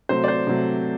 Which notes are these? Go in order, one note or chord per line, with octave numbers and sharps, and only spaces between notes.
C3 F#3 A3 C5
D5
C5
C3 F#3 A3